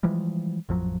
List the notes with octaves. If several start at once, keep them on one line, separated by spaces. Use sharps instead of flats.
E3 F3 G3 G#3
A1 F2 F3 F#3